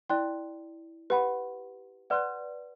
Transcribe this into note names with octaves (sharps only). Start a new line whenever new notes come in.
E4 D5 G5 C6 F#6
G4 B4 F#5 B5
B4 D5 F#5 C6 F#6